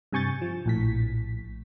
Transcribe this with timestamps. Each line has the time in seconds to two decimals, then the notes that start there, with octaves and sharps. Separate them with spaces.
0.12 G2 C3 G#5 C#6 G6 A6
0.41 F3
0.66 A#1 A2 B6